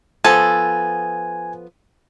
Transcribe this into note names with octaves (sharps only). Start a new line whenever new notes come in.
F3 B3 A4 G#5